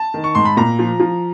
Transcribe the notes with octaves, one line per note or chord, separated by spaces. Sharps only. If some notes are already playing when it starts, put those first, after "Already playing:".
Already playing: A5
D#3
C#6
G#2 C6
B5
A#2 A#5
F3
F3